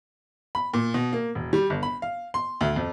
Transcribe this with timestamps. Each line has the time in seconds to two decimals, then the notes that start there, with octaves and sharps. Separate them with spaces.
0.55 B5
0.73 A#2
0.94 B2
1.13 A#3
1.35 E1
1.53 G3
1.70 G1
1.83 B5
2.02 F5
2.34 C6
2.61 D2
2.76 F2